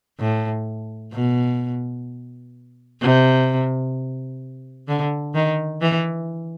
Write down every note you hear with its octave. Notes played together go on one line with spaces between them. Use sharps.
A2
B2
C3
D3
D#3
E3